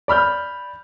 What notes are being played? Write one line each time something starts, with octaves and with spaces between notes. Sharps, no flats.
D5 B5 F6 G6